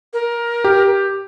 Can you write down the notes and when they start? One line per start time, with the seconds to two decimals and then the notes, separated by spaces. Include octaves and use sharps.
0.13 A#4
0.64 G4